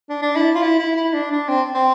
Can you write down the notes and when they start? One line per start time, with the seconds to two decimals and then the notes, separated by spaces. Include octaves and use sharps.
0.09 D4
0.22 D4
0.36 E4
0.55 F4
0.62 E4
0.79 E4
0.96 E4
1.13 D4
1.31 D4
1.48 C4
1.75 C4